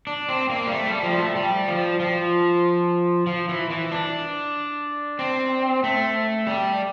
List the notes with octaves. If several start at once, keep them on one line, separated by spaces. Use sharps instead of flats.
D4
C4
A#3
G3
A3
G3
F3
A3
G3
F3
F3
F3
E3
E3
D4
C4
A3
G3